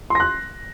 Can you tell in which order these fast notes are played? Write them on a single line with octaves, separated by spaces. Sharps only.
C6 A#6 F#6